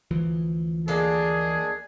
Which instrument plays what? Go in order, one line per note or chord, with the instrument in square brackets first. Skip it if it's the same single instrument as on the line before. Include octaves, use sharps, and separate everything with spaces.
[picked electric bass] D2 E3 F3
[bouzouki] G#3 A#3 D4 [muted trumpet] G#4